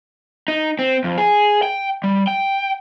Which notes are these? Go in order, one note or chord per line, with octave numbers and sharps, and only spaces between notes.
D#4
C4
F2
G#4
G5
G3
G5